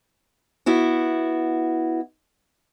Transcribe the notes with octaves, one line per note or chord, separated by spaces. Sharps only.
B3 E4 F#4